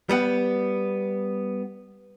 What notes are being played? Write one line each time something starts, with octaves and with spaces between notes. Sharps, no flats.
G3 B3 F#5